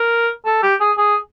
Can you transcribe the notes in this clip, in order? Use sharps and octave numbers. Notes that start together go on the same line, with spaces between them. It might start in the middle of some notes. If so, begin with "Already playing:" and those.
Already playing: A#4
A4
G4
G#4
G#4